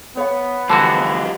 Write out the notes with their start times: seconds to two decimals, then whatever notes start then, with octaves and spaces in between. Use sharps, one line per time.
0.17 B3 C#5 F#5
0.70 D3 E3 F3 G3 F#4 A5